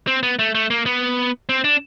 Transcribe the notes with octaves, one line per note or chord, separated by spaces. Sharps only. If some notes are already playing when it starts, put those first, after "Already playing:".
C4
B3
A3
A3
A#3
B3
C4
D4